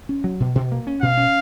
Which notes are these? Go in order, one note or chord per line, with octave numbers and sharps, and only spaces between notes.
C#4
F#3
B2
B2
A#3
C#4
B2 F5
C#4